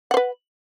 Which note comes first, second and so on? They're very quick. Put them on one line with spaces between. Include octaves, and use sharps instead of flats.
F#5 C5 B4